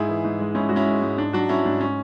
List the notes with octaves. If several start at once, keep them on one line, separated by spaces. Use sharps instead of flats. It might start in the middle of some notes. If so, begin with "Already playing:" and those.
Already playing: G#2 E4 G#4
E3
G#2
G#3
G#2 C#4 E4
G#3 F#4
C#4 E4
G#3
G#2
G#2 D4
F#3 D4 F#4
F#3 C#4 E4
G#2 D4
C#4